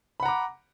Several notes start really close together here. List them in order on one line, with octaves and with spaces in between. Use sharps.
B5 F#5 A#5 D6